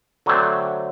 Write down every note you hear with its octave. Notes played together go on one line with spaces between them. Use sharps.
D3 F#3 A3 C4